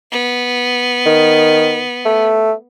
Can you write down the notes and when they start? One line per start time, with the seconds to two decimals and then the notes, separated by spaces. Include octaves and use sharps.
0.11 B3
1.06 D#3
2.05 A3